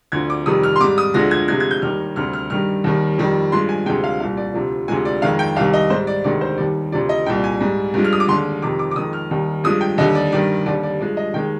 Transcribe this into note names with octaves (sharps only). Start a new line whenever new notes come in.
D2 D3 F3 G#6
D6
F2 C3 D#3 G3 D#6
F6
C6
G#2 G3 D6
D#6
D2 D3 F3 G#3 A#6
G#6
D2 C3 F3 G#3 G#6
G#6
G6
D#2 D#3 G3 F6
D2 C3 G3 F6
F6
G2 D#3 G3 F6
D#2 D#3 G3
F2 D#3 G3
G2 F3 G#3 C6
G#5
D2 C3 F3 G#3 G5
F5
C2 A#2 G3 F5
D5
D2 C3 F3
D2 C3 F3 G#3 G#5
D5
F2 D#3 G#3 F5
G5
C2 C3 D#3 F5
D#5
G#2 G3 C5
D5
D2 C3 D#3 G#3 D5
C5
D#2 D#3 G3 D5
D2 C3 F3 D5
D#5
C2 A#2 G3 G5
G#5
G#2 G3
G2 F3 G#3
F6
D#6
D6
D#2 D3 G#3 C6
F2 C3 D#3 D6
D6
D6
F2 D#3 G#3 D#6
F6
D#2 D#3 G3
G2 F3 G#3 D#6
G5
D#2 D3 G3 D#5
D5
G2 D#3 G3 D5
D#2 D3 G3 D5
D5
G2 F3 G#3 D5
D#5
D#2 D#3 G#3 G5